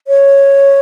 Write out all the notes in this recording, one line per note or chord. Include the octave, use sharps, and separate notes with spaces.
C#5